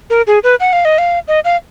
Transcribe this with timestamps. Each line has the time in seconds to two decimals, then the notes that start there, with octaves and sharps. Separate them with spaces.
0.10 A#4
0.27 G#4
0.44 B4
0.60 F#5
0.73 F5
0.85 D#5
0.98 F5
1.28 D#5
1.45 F5